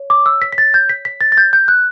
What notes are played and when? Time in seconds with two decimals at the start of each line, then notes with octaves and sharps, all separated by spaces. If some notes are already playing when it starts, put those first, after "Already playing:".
Already playing: C#5
0.10 D6
0.26 E6
0.42 B6
0.53 B6
0.58 A6
0.74 G6
0.89 B6
1.05 B6
1.21 A6
1.32 A6
1.38 G6
1.53 G6
1.68 F#6